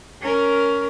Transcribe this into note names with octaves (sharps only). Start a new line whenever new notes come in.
C#4 A#4